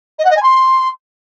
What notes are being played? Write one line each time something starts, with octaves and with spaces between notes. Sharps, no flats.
D#5
F#5
D#5
G#5
C6